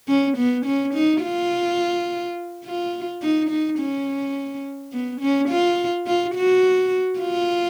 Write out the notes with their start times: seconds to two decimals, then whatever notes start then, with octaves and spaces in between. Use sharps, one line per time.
0.08 C#4
0.37 B3
0.66 C#4
0.94 D#4
1.23 F4
2.65 F4
3.22 D#4
3.49 D#4
3.79 C#4
4.93 B3
5.21 C#4
5.49 F4
6.06 F4
6.35 F#4
7.19 F4